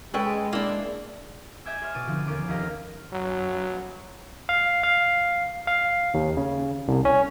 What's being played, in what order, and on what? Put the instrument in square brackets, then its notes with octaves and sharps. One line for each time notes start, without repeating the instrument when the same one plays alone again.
[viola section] G#3 [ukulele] C#4 A4 G5 [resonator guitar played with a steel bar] B4
[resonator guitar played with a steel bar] A#3 D4 [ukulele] E4
[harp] D#5 E5 G5 G#5 D6 E6
G#4 C#5 C6 F6
B2 D6 A6 D#7
D3 F3 C4 D#4
D#2 B3 C#4 D5 D6
F1 D#2 D#5 F5 A#6
[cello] F#2 [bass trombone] F#3
[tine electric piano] F5
F5
F5
D#2
C#3
C2
C#4